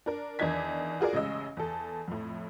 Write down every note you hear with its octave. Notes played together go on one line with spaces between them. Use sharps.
D4 A#4
E2 D#3 D4 D#4 G#6 B6
F4 F#4 G#4 A#4 D5
A1 C#3 G#3 C#4 D#5 E6
E2 A4
F2 A2